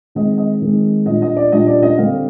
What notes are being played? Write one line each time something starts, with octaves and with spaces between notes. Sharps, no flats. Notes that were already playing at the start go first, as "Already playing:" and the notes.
D#3 G#3 C4 D#5
D#5
D#3 G#3 C4
A#2 G3 D4 D#5
D#5
D5
A#2 G3 D4 D#5
D5
D#5
D3 G3 C4 F5